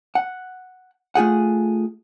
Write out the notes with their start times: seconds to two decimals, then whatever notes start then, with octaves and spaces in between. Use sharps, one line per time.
0.15 F#5
1.15 A3 F4 G#4 F#5